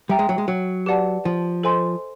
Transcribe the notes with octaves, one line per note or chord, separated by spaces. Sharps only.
G3 E5 G5 A#5
G#3
F#3
G#3
F#3
G4 B4 D5 F#5 A5
F3
A4 C5 D#5 G#5 C6